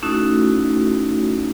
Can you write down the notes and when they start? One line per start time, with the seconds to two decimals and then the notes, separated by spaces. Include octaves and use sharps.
0.03 A3 C#4 D#4 E4 F#4 A4